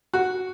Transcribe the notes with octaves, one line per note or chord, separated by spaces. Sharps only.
F#4